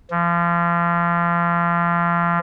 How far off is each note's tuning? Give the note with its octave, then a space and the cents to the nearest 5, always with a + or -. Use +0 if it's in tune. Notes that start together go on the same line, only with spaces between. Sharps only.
F3 -30